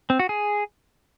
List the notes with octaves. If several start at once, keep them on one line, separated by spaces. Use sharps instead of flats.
C4
F#4
G#4